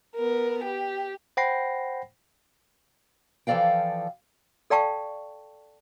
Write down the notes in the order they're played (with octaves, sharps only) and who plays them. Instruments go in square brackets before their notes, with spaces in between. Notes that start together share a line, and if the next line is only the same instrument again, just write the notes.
[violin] B3 A#4
G4
[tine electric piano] C5 F#5 G5 B5 A#6 C7
[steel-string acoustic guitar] E3 F3 A4 D5 F5 G5
[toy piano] A4 D5 F5 G5 A5 C#6